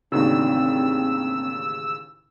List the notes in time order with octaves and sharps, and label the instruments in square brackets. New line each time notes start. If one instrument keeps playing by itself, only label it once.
[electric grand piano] A1 D#2 C#3 [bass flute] C4 [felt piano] D4 D#4 F#4 [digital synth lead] E6